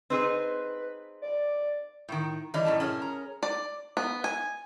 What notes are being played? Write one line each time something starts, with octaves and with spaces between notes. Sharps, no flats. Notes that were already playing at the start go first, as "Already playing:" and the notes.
C4 D#4 G#4 B4
D5
A2 D#3
E3 G3 D#4 C#5
F#2 A2 A5
C#4 G#4 A#4
A#5
D5
B3
G#5